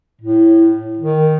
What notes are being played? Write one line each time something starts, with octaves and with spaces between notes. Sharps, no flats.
A2
D#3